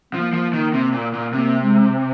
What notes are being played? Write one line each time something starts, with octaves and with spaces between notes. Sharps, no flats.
F3 A#3
F3
D#3
C3
A#2
A#2
C3 A#3
G#3